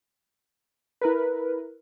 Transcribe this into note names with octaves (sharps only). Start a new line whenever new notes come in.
E4 A#4 B4